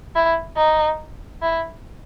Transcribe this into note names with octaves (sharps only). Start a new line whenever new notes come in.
E4
D#4
E4